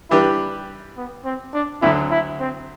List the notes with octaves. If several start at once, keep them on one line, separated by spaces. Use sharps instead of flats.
E3 G3 D4 E4 G4 B4
B3
C4
D4
D2 D3 F#3 E4
E4
C4